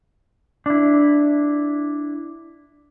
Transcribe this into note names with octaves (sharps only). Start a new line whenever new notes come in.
D4 E4